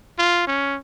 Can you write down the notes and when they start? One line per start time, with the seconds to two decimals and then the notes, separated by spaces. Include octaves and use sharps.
0.18 F4
0.47 C#4